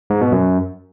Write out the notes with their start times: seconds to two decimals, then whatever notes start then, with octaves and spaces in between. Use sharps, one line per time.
0.10 G#2
0.21 B2
0.32 F#2